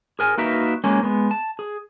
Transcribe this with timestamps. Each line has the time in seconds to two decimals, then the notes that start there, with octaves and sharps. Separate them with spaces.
0.19 G#4 A#4 G#5
0.38 A#3 D#4 F#4 A#4 B4 E5
0.84 G#3 A#3 C#4
1.03 G#3 B3
1.31 A5
1.59 G#4